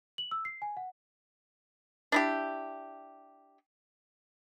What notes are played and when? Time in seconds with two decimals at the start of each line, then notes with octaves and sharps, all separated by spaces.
0.18 F#7
0.31 E6
0.45 C7
0.62 G#5
0.77 F#5
2.12 D4 E4 G4